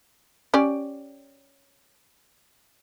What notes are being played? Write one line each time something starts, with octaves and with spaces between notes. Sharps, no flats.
C#4 G4 D5